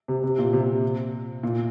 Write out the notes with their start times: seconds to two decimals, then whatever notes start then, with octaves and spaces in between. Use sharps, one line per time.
0.08 C3
0.23 C3
0.38 A#2
0.53 C3
1.43 A#2